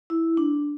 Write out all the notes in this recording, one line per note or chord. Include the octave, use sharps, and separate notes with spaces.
E4
D4